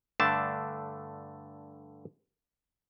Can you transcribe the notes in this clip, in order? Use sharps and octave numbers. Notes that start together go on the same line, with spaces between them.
G2 D3 A3 D4 A5